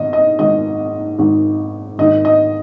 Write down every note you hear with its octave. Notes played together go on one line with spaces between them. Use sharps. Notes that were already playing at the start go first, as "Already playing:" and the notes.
Already playing: G#1 G#2 D#3 D#5
D#5
G#1 G#2 D#3 D#5
G#1 G#2 D#3
G#1 G#2 D#3 D#5
D#5